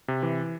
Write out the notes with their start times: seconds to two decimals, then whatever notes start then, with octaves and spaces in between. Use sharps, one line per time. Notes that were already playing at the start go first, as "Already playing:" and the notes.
0.08 C3
0.23 E3